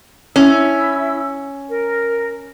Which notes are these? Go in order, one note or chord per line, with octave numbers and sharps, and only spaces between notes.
C#4 E4 E6
A#4